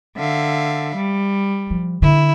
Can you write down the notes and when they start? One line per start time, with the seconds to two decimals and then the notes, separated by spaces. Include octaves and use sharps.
0.16 D3 E5 F5
0.94 G3
1.70 F3
2.02 D3 E4